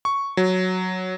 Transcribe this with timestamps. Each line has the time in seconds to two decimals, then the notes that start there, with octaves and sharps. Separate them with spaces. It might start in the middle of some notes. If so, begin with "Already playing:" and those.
0.05 C#6
0.37 F#3